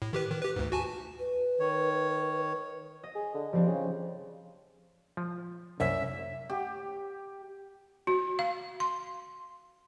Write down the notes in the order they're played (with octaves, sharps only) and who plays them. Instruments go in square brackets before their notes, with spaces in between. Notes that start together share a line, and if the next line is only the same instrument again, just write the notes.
[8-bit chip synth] A2
D#3 G4 B4
D#3
G4 B4
D2 G#2
F#4 G#5 A5
[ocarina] B4
[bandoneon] D#3 C#5
[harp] D#5
[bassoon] G#4
D3
[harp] F3 C4 D4 [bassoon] G3
[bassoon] C#3
[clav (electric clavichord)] F3
[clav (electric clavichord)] C2 F#2 A#3 [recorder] E5
[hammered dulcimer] G4
[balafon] F#4
F5
C6